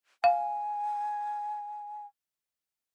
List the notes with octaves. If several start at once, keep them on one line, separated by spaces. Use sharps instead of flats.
F5 G#5